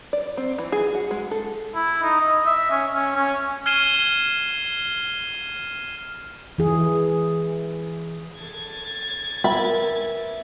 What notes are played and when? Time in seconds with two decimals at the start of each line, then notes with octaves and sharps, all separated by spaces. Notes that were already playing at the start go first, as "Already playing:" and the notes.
0.13 D5
0.37 C4
0.58 E3
0.72 G#4
0.95 F#4
1.11 G#3
1.31 A4
1.75 E4
2.03 D#4
2.21 D#5
2.46 E5
2.71 C#4
2.93 C#4
3.15 C#4
3.66 F6 G#6 C7 D#7 E7 G7
6.58 E3 G#4
8.40 A4 G#6 A6 C7
9.44 B3 A#4 E5 G#5 B5